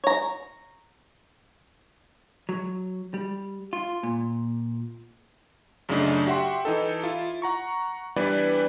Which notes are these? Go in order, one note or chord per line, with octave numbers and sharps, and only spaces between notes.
C#5 A#5
F#3
G3
F4
A#2
F#2 C#3 F#3 A3 D4 D#4
F#4 G4 E5 F#5 G5 C6
E3 D#4 A4
E4 F4
F#5 A#5 C#6
E3 G3 B3 D4 B4 D5